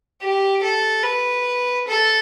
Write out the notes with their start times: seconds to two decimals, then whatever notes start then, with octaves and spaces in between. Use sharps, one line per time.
0.21 G4
0.63 A4
1.04 B4
1.88 A4